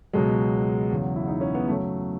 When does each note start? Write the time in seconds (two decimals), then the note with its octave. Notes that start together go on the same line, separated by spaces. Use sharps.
0.13 C#2 B2 F#3 G#3
0.90 E2 C#3 F#3
1.16 E4
1.28 D#4
1.41 C#4
1.55 B3
1.68 F#2 C#3 F#3 A3